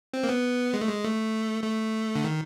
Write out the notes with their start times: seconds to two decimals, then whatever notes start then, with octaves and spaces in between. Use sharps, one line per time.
0.14 C4
0.23 A#3
0.29 B3
0.74 G#3
0.81 A3
0.89 G#3
1.03 A3
1.63 A3
2.15 D3
2.24 D#3